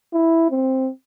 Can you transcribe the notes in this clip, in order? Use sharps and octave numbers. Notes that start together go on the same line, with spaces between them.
E4
C4